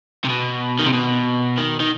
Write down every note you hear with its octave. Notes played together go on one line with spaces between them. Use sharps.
C3
B2
D#3
C3
B2
D#3
D#3